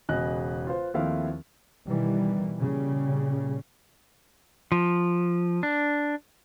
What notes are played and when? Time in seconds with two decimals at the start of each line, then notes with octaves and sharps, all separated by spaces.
0.09 E1 C#3 D#5 F#6
0.67 F4 B4 C5
0.94 D#2 F3 A3 C4 E4 F5
1.88 B2 D#3 E3 G3
2.59 A#2 C#3 G3
4.72 F3
5.63 D4